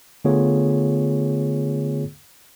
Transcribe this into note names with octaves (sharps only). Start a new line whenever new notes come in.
D3 A3 B3 F4 G#4 C#5